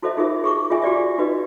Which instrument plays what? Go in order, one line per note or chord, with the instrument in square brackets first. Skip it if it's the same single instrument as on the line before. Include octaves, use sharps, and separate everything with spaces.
[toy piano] E4 F#4 A4 C5 D#5 E5
D#4 F4 G#4 A#4 C5 E5
G#4 C#6 D6
F4 G#4 D#5 E5 G#5
F#4 G4 D5 E5
D#4 F#4 B4 D#5